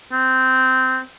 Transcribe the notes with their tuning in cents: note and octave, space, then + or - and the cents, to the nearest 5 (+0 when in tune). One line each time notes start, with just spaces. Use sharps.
C4 -15